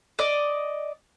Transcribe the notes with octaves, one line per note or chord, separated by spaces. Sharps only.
D5 D#5